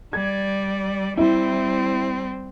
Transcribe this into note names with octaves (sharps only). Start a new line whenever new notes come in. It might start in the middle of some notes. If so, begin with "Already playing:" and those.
G3 D5 G#6
G3 C4 E4